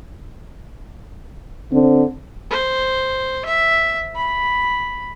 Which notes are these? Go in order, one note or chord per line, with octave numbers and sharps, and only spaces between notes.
D3 C4
C5
E5
B5